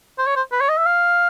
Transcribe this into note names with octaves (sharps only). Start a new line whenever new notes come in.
C5
C#5
C5
B4
C#5
D#5
E5
F5